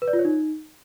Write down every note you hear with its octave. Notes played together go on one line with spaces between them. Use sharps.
B4
D5
F4
C#5
D#4